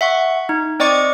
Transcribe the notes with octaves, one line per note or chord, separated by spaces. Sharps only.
E5 F#5 C#6
D#4
C4 D5 D#5 C#6 D6 C#7